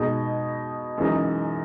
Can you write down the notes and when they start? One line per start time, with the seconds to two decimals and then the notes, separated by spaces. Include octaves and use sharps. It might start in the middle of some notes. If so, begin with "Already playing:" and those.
Already playing: B2 G#3 D#4 G#4
0.98 F#2 E3 G#3 D#4